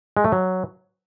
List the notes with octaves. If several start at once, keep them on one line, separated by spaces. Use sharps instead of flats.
G#3
A3
F#3